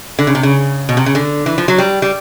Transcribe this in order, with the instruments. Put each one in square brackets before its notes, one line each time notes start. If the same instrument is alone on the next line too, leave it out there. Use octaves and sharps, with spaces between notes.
[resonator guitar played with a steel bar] D3
C#3
C3
C#3
B2
C3
C#3
D3
E3
F3
F#3
G3
G3